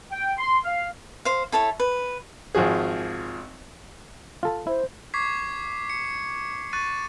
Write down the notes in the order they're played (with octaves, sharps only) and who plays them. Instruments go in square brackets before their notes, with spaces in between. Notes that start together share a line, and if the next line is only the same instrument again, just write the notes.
[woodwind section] G5
C6
F5
[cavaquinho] C5 F5
E4 A4 C#5 E5
B4
[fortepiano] G#1 F3 F#4 G#4
[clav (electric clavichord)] F4 A4 A5
[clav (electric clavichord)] E4 [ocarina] C5
[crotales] C#6 D6 G#6 B6 C7
C#7
C#6 F#6 A6 D#7